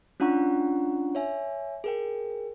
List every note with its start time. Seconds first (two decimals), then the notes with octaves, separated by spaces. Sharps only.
0.20 C#4 D4 F4 F#5 A#5 C#6
1.15 C#5 E5 G#5
1.84 G#4 A#4 G5